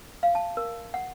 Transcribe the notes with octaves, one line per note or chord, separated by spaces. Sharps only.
F5
A5
A#4
F#5